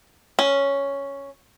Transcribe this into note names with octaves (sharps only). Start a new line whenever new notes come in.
C#4